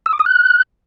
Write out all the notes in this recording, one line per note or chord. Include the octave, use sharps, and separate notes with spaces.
E6
D6
D#6
F#6